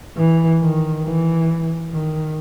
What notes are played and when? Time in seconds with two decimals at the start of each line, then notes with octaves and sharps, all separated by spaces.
0.17 E3
0.61 D#3
1.04 E3
1.91 D#3